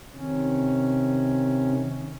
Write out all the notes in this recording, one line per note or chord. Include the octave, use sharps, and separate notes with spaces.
C3 D#3 C#4